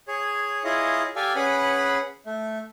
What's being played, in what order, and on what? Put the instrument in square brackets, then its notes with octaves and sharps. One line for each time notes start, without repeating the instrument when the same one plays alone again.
[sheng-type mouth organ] G#4 C#5
E4 F4 G#4 C#5 D#5
G4 A4 D5 F5 G#5
C#4 G#4 B4 F#5 B5
A3